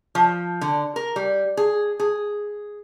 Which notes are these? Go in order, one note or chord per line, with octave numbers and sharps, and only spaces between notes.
F3
D3
A#4
G3
G#4
G#4